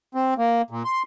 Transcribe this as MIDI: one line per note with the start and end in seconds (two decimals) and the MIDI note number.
0.15 0.34 60
0.38 0.62 58
0.70 0.83 46
0.85 1.03 84